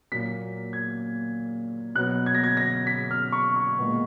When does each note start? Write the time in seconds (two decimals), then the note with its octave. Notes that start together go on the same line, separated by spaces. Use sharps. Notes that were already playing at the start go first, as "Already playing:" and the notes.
0.12 A#2 F#3 A#3 B6
0.73 G#6
1.95 B2 F#3 B3 F#6
2.26 G#6
2.34 A#6
2.44 G#6
2.57 A#6
2.87 B6
3.11 F6
3.32 C#6
3.56 C#6
3.79 A#2 G#3 B3